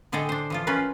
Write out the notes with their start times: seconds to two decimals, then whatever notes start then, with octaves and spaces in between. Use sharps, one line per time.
0.12 A2 D3 G#4 A4 D#5 G5
0.29 D4 C5
0.50 E3 F3 F4
0.67 C#4 F4 A#4 B4